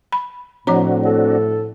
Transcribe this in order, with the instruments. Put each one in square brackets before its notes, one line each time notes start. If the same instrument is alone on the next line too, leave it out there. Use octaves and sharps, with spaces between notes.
[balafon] B5
[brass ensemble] A2 [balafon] F3 C#5 A#5 [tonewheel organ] C4 D4 F#4
[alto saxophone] A4